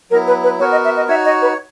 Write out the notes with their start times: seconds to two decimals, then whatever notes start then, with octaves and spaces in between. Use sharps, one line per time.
0.10 F#3 B3 E4 A#4
0.27 B4
0.44 B4
0.59 B3 F#4 A#4 C#5
0.72 D#5
0.85 E5
0.97 D#5
1.08 D#4 F#4 C#5 E5
1.25 D#5
1.42 B4